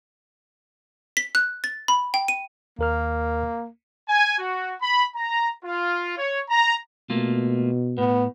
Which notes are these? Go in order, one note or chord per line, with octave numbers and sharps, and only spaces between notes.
B6
F#6
A6
B5
G5
D#7
D#2 A#3 A#4 F6
G#5
F#4
B5
A#5
F4
C#5
A#5
B2 A3 A#3 F4
A2 B3